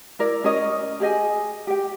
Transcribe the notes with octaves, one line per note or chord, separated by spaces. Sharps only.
E4 A#4 D5
C#4 A#4 C#5 D#5
G4 G#4 D#5 G#5
G4 G5